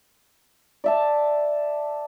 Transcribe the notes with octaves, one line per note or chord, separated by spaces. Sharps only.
D5 E5 A5